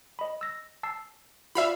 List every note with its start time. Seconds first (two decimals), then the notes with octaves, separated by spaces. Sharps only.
0.19 D#5 B5
0.41 E6 A#6
0.83 A5 E6 C7
1.55 F4 F#4 D5 E5 F5 B5